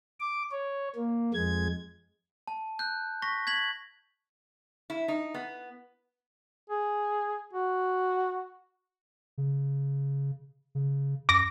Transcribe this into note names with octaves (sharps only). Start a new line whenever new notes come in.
D6
C#5
A#3
F2 G#3 G#6
A5
F#6 G6
C#6 A#6 B6
G#6 B6 F#7
E4
D#4
B3
G#4
F#4
C#3
C#3
F#2 D6 A#6